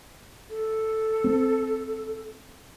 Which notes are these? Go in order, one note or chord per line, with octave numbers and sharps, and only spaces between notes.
A4
C4